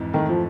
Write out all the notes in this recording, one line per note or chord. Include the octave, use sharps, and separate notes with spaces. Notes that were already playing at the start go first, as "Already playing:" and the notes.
Already playing: F2 G#2 E3
D#3 A3
F3